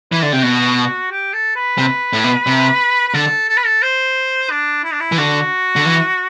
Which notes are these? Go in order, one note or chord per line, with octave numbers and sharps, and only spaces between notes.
E3 B4
D3 A4
C3 G4
B2 F#4
G4
A4
B4
C3
A2
B2
C3
B4
D3 A4
A4
B4
A4
C5
D4
E4
D4
E4
E3
D3 F#4
D3
E3